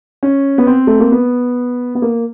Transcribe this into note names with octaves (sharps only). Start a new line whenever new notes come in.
C#4
B3
C4
A3
A#3
B3
B3
A#3